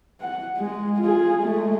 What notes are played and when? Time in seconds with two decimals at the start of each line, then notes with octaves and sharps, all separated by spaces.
0.21 F#5
0.57 G#3
1.01 F4 G#4
1.38 G#3 A3